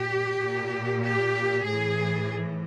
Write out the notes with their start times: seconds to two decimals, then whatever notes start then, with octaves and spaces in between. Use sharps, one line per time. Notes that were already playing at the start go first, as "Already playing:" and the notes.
Already playing: A#2 G4
0.43 A#2
1.04 G4
1.66 A2 E3 G#4